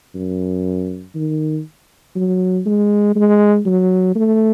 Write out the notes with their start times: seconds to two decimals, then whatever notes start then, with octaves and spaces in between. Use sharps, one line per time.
0.15 F#2
1.15 D#3
2.16 F#3
2.66 G#3
3.16 G#3
3.66 F#3
4.16 A3